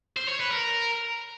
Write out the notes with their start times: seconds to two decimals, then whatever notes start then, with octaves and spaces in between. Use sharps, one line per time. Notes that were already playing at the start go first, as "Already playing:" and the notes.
0.17 C5
0.28 C#5
0.40 B4
0.51 A#4